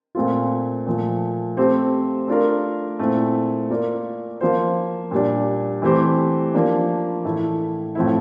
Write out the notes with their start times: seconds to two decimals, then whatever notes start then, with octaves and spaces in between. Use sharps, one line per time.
0.15 A#2 A3 C4 F4
0.87 A#2 F3 A3
1.57 A3 C4 G4 C5
2.28 A3 D4 F4 A#4
2.99 A#2 A3 C4 E4
3.70 A#3 F4 A#4 D5
4.41 F3 A#3 F4 C5
5.11 A#2 G3 D4
5.82 E3 A3 C4 G4 C5
6.54 F3 A#3 D4
7.24 A2 E3 A3 E4
7.95 A2 F3 C4 E4